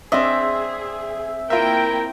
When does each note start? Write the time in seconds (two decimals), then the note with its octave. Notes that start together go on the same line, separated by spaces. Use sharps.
0.12 C4 D4 G#4 D#5 E5
1.50 A#3 E4 F4 A#4 E5 G5